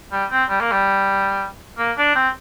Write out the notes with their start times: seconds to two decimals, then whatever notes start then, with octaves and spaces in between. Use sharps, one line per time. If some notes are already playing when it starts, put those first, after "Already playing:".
0.12 G3
0.31 C4
0.49 G3
0.60 A#3
0.72 G3
1.78 A#3
1.97 D4
2.15 C4